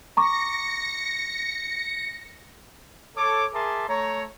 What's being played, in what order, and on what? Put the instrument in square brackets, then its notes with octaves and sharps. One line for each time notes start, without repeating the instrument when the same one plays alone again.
[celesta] A#5 C#6 D6 [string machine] A#6 C#7
[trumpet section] A4 C#5 D6
G#4 A#4 E5 A5 C6 D6
A3 C#5 A#5